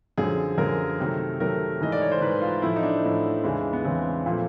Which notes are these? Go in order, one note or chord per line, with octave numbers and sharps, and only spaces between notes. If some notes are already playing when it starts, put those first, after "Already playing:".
F#2 D3 F3 G#4
F#2 D3 F3 A#4
C3 D#3 F#3 A3
C3 D#3 F#3 A3 A#4
G#2 E3 A3 D#5
D5
C#5
C5
G#2 E3 A3 B4
F4
A2 F3 A3 E4
D#4
D4
A2 F3 A3
E2 C#3 E3 G#3
B3
E2 C#3 E3 G#3 C4
A#2 F3 A3